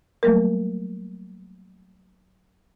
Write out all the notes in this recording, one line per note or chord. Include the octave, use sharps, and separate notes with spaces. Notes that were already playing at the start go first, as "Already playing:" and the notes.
F#3 G3 A3 A#3 A#4